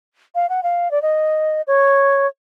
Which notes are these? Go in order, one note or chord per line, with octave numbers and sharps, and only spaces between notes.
F5
F#5
F5
D5
D#5
C#5